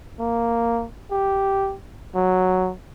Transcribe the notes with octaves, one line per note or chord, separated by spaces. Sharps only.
A#3
G4
F#3